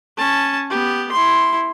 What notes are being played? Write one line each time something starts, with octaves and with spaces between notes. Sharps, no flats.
C#4 A5
B3 G4
E4 C6